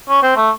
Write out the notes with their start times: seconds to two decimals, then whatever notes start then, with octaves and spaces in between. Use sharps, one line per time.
0.09 C#4
0.23 C4
0.36 A3